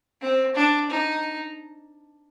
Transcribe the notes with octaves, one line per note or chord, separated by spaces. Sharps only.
C4
D4
D#4